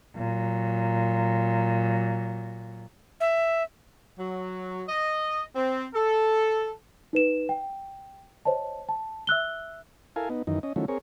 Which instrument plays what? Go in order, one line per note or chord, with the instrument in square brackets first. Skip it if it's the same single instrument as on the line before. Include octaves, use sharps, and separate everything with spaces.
[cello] A#2 F#3
[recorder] E5
[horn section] F#3
D#5
C4
A4
[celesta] D#4 B4 E7
G5
C5 C#5 D#5 A5
A5
E5 E6 F#6 G7
[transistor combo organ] E4 A4 A#4 F5 G#5
B3 D#4
F#2 D#3 E3 D#4
C#4 D#5
D#3 F3 F#3 A3 C#4 E4
C4 G#4 A#4 C#5